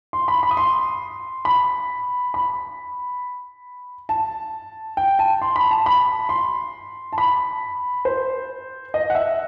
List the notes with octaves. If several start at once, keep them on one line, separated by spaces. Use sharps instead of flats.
C6
B5
B5
D#6
C6
B5
B5
A5
G5
A5
C6
B5
A5
B5
C6
A5
B5
C5
D#5
F#5
E5